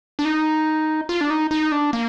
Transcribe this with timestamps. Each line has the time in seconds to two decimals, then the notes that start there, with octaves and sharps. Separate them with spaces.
0.19 D4
0.25 D#4
1.09 F4
1.21 D4
1.30 D#4
1.51 D#4
1.72 D4
1.93 A#3